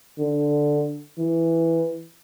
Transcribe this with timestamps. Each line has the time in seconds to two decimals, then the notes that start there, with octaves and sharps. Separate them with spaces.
0.19 D3
1.18 E3